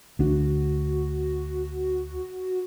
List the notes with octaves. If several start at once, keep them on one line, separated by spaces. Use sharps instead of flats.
D2 D4 F#4